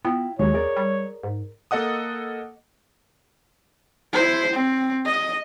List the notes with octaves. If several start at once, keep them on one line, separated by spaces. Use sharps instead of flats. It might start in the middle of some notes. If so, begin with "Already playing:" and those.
B3 E4 F4 G5
D#2 D#3 F#3 G#3 C#5
G#4 A#4 D5
G3
G#2
A#3 A4 D#5 F#5 D#6
E4 C5
C4
D#5